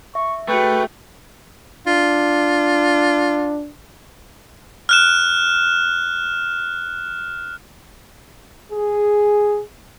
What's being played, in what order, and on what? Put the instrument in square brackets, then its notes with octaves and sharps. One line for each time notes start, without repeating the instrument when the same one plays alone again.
[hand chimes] E5 [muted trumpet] C#6
[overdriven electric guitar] A3 [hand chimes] F#4 G#4 C#6 [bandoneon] B4 [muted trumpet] G5
[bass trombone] D4 [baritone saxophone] F4
[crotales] F6 F#6 E7
[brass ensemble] G#4